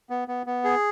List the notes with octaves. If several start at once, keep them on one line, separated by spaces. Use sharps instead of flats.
B3
B3
B3
G#4